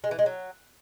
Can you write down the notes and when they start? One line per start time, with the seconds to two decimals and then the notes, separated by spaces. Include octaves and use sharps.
0.04 G#3
0.11 E3
0.19 G#3
0.26 F#3